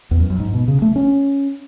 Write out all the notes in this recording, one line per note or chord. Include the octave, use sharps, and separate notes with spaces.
E2
F#2
F#2
G#2
B2
C#3
A3
C#4